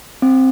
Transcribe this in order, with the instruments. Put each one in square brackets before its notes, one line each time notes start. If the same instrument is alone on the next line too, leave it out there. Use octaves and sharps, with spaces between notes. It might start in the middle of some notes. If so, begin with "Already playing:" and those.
[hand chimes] C4